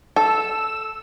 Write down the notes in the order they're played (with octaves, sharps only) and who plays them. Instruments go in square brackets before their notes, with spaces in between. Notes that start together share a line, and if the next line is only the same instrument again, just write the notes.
[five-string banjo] A4 [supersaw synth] E6